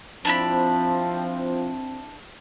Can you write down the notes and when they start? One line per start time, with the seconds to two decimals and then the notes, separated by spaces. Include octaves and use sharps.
0.25 F3 C4 D4 E4 B5